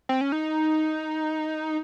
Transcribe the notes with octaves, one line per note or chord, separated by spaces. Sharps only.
C4
C#4
D#4